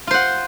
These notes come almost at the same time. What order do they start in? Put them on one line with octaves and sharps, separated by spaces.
F4 C5 F#5